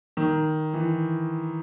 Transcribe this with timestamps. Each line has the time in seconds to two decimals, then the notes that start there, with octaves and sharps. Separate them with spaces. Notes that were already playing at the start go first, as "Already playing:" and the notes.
0.17 D#3
0.73 E3